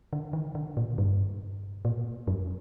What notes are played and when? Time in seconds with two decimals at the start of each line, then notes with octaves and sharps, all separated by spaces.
0.13 D3
0.33 D#3
0.55 D3
0.77 A#2
0.98 G2
1.85 A#2
2.28 F#2